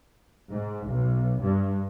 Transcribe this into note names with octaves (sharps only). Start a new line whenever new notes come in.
G#2
B1
G2